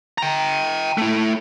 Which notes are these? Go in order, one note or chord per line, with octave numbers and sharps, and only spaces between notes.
G5 A#5
A3 E4